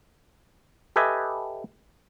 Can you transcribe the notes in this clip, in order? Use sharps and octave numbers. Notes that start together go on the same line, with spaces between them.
G4 A4 B4 D#5 E5 G#5